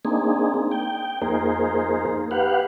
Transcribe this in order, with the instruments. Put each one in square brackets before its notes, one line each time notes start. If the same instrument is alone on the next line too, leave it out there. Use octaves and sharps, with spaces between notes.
[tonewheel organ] A#3 C4 D4 D#4 G#4
G5
F2 A#3 D#4 G#4 A#4 C5
G4 B4 F5 F#5